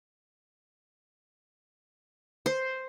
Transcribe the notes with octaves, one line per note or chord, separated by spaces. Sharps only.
C5